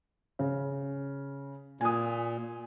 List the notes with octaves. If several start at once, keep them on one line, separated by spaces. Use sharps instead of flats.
C#3
A#2 G#5 D#6